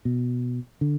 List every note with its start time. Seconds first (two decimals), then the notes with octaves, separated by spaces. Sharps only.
0.05 B2
0.81 D3